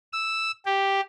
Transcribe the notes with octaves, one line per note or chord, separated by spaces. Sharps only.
E6
G4